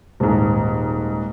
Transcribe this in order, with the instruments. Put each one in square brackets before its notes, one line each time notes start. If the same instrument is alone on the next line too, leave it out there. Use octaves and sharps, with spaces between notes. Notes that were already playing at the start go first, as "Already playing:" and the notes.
[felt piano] D#1 G#2